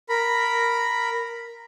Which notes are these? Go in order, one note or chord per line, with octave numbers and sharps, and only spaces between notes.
A#4 B5